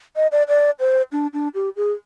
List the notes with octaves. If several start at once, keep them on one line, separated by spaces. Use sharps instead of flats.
D#5
D5
D5
C5
D4
D4
G4
G#4